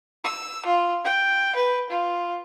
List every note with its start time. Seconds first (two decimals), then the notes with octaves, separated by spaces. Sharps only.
0.24 E6
0.66 F4
1.04 G5
1.55 B4
1.90 F4